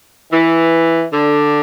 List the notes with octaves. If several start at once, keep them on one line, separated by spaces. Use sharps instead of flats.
E3
D3